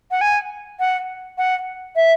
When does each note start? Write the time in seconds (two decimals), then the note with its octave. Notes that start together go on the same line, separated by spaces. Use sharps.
0.11 F#5
0.21 G#5
0.80 F#5
1.38 F#5
1.96 E5